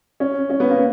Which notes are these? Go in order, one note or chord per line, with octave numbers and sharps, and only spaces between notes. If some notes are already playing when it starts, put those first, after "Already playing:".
C#4
C#4
B3
A#3